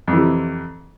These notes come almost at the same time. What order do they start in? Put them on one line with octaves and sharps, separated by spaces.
F2 E3 C3